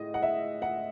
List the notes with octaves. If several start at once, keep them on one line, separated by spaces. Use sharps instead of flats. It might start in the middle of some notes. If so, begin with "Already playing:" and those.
Already playing: A2 G#3 D#5
F#5
E5
F#5